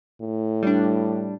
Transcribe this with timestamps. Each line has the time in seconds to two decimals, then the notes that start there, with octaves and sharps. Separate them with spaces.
0.21 A2
0.63 G3 D4